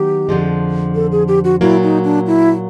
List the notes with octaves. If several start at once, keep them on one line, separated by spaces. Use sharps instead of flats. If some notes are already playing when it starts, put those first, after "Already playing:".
Already playing: D#3 F#3 B3 G4
F2 D3 F3 G#3
A4
G#4
G4
F#4
A#2 F#3 A#3 E4
D#4
D4
E4